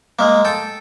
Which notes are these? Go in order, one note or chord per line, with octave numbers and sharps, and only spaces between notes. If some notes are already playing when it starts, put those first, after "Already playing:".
G#3 A#3
A4 G5